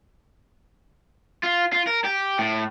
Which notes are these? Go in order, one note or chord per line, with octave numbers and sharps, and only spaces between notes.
F4
F4
A#4
G4
A2